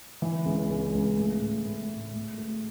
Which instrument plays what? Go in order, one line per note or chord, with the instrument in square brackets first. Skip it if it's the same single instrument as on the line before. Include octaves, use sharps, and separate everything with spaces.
[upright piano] E3
C#2
C#2
C#2
A2
A2
A2
A2
A2
A3